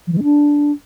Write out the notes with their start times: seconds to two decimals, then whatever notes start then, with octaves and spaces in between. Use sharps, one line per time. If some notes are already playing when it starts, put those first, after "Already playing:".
0.07 F3
0.12 E3
0.18 G#3
0.23 D4